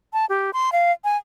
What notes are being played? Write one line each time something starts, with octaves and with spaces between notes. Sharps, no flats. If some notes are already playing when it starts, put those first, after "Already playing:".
A5
G4
C6
F5
G#5